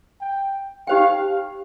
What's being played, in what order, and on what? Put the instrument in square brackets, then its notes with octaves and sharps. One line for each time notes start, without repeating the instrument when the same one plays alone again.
[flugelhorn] G5
[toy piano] D#4 G4 C5 G5 [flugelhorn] F5